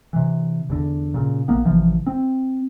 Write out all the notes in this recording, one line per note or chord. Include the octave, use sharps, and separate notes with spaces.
C3 E3
E2 D3
A#2 C#3
A#1 A#3 B3
A1 C3 E3 F3
C4